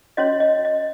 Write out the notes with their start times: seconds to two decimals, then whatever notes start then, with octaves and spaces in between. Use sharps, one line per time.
0.17 C#4 F#4 C#5 D#5
0.40 D#5
0.65 D#5